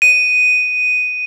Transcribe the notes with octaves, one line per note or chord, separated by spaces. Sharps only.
D#7